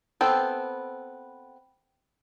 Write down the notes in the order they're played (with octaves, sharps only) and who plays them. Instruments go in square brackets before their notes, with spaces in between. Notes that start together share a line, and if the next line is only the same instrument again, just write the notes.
[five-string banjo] B3 C4 A4 G5